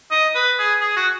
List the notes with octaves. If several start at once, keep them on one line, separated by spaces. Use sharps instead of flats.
D#5
B4
G#4
G#4
F#4